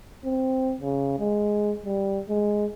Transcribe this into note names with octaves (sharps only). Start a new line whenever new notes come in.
C4
C#3
G#3
G3
G#3